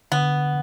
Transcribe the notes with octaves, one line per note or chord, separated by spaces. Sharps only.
D3 B3